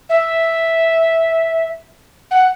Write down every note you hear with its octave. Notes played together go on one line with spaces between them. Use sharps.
E5
F#5